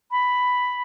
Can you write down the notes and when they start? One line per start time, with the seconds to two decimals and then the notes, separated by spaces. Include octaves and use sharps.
0.11 B5